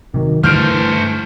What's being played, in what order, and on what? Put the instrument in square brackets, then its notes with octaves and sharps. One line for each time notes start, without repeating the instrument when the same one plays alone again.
[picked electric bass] C3 F#3 [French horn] D#3
[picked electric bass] G2 D3 [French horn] E3 [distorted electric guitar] A3 C5 [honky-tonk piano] F6 G6 D7